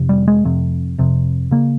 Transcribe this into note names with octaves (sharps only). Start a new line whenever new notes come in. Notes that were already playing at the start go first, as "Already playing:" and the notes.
Already playing: F1 F2 C3
G3
G#3
F1 F2 C3
F1 F2 C3
C#3 A#3